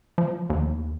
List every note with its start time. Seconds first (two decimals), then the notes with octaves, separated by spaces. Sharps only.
0.18 F3
0.50 D#2